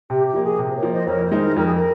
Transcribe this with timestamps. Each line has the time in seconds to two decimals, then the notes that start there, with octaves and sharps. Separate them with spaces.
0.09 C3 G4
0.25 G4
0.33 F3 A#3
0.42 G#4
0.59 C3
0.69 C5
0.74 A#4 C#5
0.83 F3 A#3
0.90 C5 D#5
1.07 F2 A#4 C#5
1.24 C5
1.31 D#3 G#3 D#4
1.40 A#4
1.56 F2 A#4
1.64 G#4
1.74 A#4